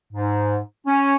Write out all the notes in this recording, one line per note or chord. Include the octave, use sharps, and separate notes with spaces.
G#2
C#4